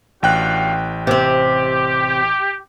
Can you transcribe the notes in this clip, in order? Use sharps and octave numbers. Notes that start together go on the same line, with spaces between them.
A1 D4 F#4 F5 G5 F#6
C3 C4 G4